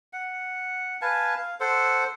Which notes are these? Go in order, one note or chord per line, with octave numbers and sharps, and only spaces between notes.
F#5
B4 F5 G#5 A5
F5
A4 C5 F#5